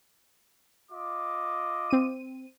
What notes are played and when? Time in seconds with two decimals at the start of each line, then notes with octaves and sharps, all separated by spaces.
0.91 F4 D#5 D6
1.90 C4 D#7